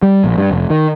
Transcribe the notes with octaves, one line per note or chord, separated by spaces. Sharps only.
G3
A#1
G2
F1
D#3